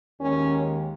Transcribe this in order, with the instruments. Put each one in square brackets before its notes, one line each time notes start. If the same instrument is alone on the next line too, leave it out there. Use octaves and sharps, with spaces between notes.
[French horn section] D#2 D#3 G#3 C#4